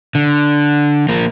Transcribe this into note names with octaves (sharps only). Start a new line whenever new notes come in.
D3
F3 A#3